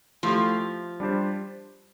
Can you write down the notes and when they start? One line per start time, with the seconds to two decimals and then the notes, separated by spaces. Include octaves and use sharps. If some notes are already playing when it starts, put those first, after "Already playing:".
0.23 F3 A3 E4 G4
1.00 G3 D4 G4 C5